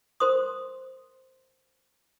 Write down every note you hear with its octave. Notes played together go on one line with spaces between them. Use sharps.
A#4 C5 C6 D#6